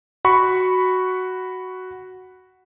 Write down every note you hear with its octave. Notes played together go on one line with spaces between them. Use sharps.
F#4 B5 C#6